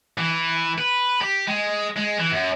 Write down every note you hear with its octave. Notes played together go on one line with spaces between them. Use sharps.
E3
B4
G4
G#3
G#3
E3
F#2